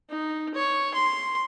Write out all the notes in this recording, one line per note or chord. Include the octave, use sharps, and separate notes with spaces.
D#4
C#5
C6